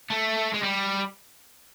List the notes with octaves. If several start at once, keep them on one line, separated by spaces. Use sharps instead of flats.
A3
G#3
G3